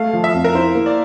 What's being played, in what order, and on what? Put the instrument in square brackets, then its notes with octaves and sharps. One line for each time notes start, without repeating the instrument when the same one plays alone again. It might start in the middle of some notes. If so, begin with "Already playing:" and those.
Already playing: [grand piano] A3 [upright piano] F5
[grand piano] F3
[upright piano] E5
[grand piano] F2
[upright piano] A#4
[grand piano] E4 [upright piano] C5
[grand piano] A#3
[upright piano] D5